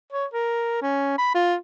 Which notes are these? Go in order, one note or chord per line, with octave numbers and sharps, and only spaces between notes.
C#5
A#4
C#4
B5
F4